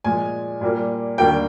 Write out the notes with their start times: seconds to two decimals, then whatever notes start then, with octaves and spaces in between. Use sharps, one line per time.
0.04 A#2 F3 G#3 G#5
0.61 A#2 G3 A#3
1.18 D#2 D3 G3 A#3 G5